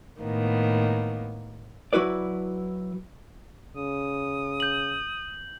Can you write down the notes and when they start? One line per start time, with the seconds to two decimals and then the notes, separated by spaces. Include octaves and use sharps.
0.21 A2 D#3 A#3 B3
1.93 F#3 E4 F#4 B4 D5
3.77 C#3 D#6
4.60 G6 F#7